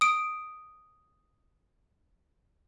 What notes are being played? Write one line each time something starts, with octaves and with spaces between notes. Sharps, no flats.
D#6 D7